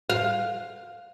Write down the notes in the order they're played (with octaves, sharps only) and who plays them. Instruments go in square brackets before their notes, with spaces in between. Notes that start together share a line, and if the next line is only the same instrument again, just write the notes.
[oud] F5